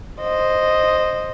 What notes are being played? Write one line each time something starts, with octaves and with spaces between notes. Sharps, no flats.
C5 D#5